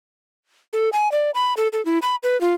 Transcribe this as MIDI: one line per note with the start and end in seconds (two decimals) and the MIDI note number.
0.73 0.89 69
0.93 1.11 80
1.12 1.31 74
1.34 1.54 83
1.57 1.68 69
1.73 1.84 69
1.85 1.99 64
2.02 2.15 83
2.23 2.39 71
2.41 2.54 65